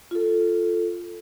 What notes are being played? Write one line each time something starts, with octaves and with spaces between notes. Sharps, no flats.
F4 A4